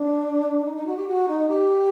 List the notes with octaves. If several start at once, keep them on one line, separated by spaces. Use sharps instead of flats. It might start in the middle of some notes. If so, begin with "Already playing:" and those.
Already playing: D4
D#4
D#4
F#4
G4
F#4
D#4
G4